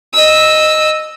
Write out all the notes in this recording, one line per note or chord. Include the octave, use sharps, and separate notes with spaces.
D#5 E6